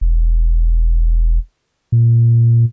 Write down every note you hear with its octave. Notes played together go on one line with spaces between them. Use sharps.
E1
A#2